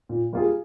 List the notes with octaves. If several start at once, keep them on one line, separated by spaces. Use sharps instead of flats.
A#2
G3 A#3 F4 G#4